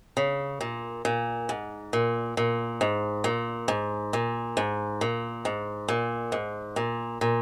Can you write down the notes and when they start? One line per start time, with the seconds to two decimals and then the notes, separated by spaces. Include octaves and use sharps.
0.17 C#3
0.61 A#2
1.05 A#2
1.49 G#2
1.93 A#2
2.37 A#2
2.81 G#2
3.24 A#2
3.68 G#2
4.13 A#2
4.57 G#2
5.01 A#2
5.45 G#2
5.88 A#2
6.32 G#2
6.76 A#2
7.21 A#2